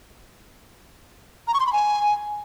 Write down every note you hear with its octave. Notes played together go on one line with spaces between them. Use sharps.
A#5
C#6
C6
B5
G#5